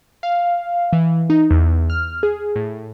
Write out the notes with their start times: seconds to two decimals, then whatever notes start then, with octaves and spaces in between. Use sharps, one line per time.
0.23 F5
0.93 E3
1.30 D#4
1.51 E2
1.90 F6
2.23 G#4
2.56 A2